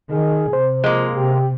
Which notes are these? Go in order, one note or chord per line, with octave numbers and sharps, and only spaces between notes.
D#3 G#4
C3 C5
F3 G#3 A#3
C3 G4